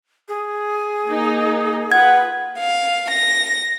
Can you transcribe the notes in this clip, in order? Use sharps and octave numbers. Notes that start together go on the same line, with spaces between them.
G#4
A#3 D#4
F4 B4 F#5 G#6
F5
A#6